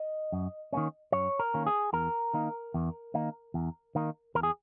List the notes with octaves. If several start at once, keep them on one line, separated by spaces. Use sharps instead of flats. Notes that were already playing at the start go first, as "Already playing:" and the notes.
Already playing: D#5
F#2
D#3 A#3 C#4
F#2 C#5
A#4
D#3 A#3 C#4
G#4
E2 A#4
D#3 A#3 D#4
E2
D#3 A#3 D#4
E2
D#3 A#3 D#4
E2 A#4
G#4